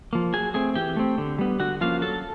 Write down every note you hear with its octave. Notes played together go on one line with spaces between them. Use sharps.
F3 A#3
F#3 G#4 G#5
A3 C4 G#4 G#5
E3 G4 G5
A3 C4
D3
G3 B3
D3 F#4 F#5
F3 A#3 C#4 F4 F5
F#3 A4 A5